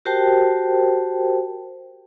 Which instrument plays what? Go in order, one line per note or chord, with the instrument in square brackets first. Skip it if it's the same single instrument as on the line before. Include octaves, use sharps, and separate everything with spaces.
[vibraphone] F#4 G4 A#4 C5 G5 A5